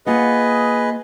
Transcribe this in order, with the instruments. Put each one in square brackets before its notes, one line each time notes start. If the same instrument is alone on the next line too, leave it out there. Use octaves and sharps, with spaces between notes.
[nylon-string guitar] A#3 F4 F#5 [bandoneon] G#4 B4 D#5